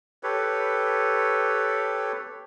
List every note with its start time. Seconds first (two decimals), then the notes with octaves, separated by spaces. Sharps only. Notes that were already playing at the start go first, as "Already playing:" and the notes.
0.23 G4 A4 B4 C#5